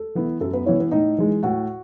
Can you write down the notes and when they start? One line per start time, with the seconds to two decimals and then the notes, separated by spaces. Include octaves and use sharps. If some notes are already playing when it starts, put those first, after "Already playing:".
Already playing: A4
0.15 E3 B3 E4
0.40 F#2 A4
0.53 B3 B4
0.66 E3 B3 C#4 E4 C#5
0.79 B3 B4
0.91 A2 D#4 D#5
1.18 E3 G#3
1.43 A2 F#4 F#5